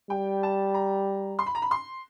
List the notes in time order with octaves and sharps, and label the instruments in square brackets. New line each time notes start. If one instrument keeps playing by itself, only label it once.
[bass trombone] G3 [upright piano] G5
[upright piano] A5
A#5
C6
B5
A#5
B5
C6